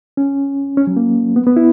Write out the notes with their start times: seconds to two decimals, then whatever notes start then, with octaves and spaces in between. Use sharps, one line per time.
0.17 C#4
0.77 C#4
0.87 F#3
0.97 A#3
1.36 B3
1.46 B3
1.56 E4